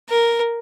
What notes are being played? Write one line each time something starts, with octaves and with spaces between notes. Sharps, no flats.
A#4